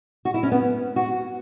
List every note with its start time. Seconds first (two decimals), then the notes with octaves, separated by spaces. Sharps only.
0.25 F#4
0.34 E4
0.43 C#4
0.52 B3
0.96 F#4